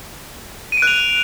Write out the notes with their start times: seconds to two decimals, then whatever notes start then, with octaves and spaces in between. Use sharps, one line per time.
0.72 D#7
0.77 D7
0.82 F#6
0.87 F7